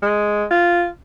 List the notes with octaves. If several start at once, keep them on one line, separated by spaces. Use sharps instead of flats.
G#3
F4